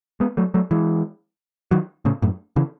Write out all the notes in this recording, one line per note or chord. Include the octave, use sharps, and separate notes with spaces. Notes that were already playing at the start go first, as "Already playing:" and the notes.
G#3 B3
F#3 A3
F#3 A3
E3 G#3
D#3 F#3
A2 C#3
F#2 A2
C#3 E3